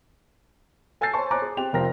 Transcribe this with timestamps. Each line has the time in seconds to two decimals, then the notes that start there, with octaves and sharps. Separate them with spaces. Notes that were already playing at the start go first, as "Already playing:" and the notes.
1.01 A4 G#5 E6 G6 A6 C7
1.13 C5 C#5 G#5 A5 C6 C#6
1.31 C5 C#5 G#5 A#5 D6 F#6
1.42 G#4
1.57 C4 G4 F7
1.73 F1 F3 A#4 C5 G5 A#6